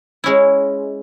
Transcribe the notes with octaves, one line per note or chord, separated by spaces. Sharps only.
G#3 C#4 E4